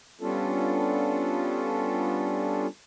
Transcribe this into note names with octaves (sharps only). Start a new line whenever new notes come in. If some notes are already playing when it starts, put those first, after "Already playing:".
G3 B3 C#4 D4 F4 A4